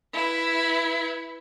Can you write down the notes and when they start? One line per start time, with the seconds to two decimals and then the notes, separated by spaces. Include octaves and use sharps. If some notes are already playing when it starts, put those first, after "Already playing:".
0.14 E4 B4